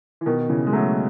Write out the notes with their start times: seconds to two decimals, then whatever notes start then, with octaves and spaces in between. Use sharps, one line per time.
0.21 E3
0.26 B2 D#3
0.49 C#3 E3
0.67 G#3
0.73 F#3 A3